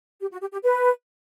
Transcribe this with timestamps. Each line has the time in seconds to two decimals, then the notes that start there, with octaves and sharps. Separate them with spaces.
0.20 G4
0.31 F#4
0.41 G4
0.52 G4
0.63 B4